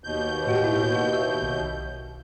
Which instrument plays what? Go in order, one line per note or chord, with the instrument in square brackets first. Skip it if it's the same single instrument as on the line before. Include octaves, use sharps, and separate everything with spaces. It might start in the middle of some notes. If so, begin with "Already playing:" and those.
[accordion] D#2 B2 G6
[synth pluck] A2 F#4 G4
E4
F#4
E5
B1